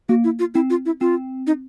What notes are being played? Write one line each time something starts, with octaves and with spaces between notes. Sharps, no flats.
A#3 F#4
E4
F4
C4 E4
F4
E4
C4 F4
D#4